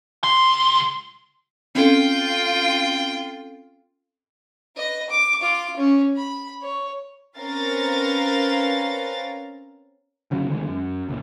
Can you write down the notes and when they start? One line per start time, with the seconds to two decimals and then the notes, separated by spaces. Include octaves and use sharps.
0.24 C#2 C6
1.75 C4 C#4 F4 A4 G5
4.76 B4 D#5
5.10 D6
5.41 F4 D6
5.76 C#4
6.16 B5
6.62 C#5
7.38 C4 C#4 A#4 B4 F5 A6
10.31 G1 C#3 F#3
10.48 D2 D#3 G#3
10.67 F#2
11.09 C#2 A#2